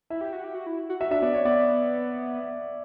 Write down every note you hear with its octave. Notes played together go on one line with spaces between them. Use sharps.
E4 E5
G4
F#4
G4
F#4
E4
F#4
F#4 E5
D4 E5
B3 D5
C#5
B3 D5